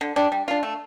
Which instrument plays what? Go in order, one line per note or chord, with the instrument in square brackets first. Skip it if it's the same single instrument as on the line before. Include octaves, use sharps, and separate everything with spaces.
[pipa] D3
G3 D4
G3
D4 F4
A3